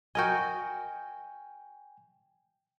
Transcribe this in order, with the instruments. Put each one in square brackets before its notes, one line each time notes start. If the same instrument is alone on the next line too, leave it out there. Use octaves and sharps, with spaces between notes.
[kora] F#4 A#4 D#5 [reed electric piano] G5 G#5